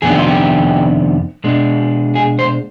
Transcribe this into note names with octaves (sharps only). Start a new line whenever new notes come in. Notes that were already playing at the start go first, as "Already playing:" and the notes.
F2 C3 D#3 B3 D4 G#4
G4
F4
G4
B2 G#3 D4
G#4
C5